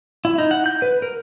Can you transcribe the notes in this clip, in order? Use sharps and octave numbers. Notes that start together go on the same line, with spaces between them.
E4
D#4
F#5
G6
B4
A#4